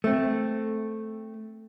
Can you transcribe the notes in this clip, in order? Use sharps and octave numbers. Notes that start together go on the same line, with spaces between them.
A3 C4